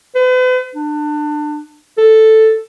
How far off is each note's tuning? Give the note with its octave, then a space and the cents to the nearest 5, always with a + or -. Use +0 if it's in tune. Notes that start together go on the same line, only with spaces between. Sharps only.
B4 +45
D4 +25
A4 +0